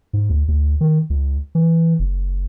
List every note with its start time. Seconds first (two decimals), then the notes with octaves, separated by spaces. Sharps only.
0.13 G#2
0.30 D2
0.48 D2
0.81 D#3
1.10 C#2
1.55 E3
1.99 F#1